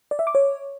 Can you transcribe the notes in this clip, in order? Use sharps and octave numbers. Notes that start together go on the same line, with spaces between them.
D5
E5
D6
C#5